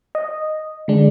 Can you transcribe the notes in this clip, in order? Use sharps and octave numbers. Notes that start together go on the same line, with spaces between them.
D#5
D3 G#3 D4